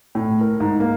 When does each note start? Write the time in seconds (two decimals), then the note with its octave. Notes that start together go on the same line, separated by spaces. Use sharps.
0.15 A2
0.41 A#4
0.60 G#2
0.80 A#3